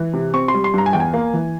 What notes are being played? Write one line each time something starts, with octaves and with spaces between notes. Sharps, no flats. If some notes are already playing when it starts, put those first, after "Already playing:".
Already playing: E3
C3
C4 C#6
C6
G3
C6
G2 A#5
G#5
E2 G5
G#5
A#3
E3